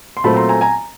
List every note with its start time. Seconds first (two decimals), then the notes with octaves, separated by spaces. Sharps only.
0.17 C6
0.24 A#2 F#3 A3 C4 A5 B5
0.36 A#5 C6
0.49 G#5 A#5
0.61 G#5 A#5